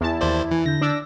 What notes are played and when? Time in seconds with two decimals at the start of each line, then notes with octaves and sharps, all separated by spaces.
0.01 E2 E4 A5
0.21 D#2 C5 D5
0.51 E3 G#5
0.66 D3 G6 A#6
0.81 D4 D6 E6